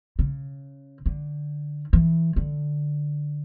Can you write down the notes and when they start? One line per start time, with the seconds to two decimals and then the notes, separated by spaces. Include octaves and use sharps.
0.19 C#3
1.06 D3
1.93 E3
2.36 D3